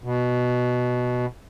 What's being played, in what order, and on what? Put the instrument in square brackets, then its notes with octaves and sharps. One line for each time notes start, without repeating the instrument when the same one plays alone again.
[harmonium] B2